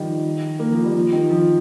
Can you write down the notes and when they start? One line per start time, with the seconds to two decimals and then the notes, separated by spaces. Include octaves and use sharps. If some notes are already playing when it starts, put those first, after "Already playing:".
Already playing: D#3 F3 G3
0.59 A#3
0.72 F3
0.84 G3
0.94 F3
1.12 D#3
1.30 F3